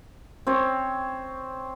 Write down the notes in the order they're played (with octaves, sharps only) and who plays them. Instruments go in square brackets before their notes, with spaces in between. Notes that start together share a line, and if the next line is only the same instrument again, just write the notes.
[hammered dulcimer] C4 C#5